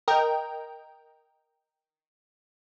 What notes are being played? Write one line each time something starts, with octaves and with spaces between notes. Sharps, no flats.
A#4 D#5 G5